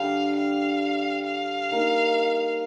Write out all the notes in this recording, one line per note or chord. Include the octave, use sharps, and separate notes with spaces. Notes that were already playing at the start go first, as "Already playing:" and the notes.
Already playing: D3 G3 D4 G4 F5
F5
F5
A#3 D#4 A#4